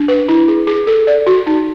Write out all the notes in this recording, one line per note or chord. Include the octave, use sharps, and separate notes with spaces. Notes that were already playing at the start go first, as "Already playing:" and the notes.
Already playing: D4
B4
E4
G#4
G#4
A4
D5
F#4
D#4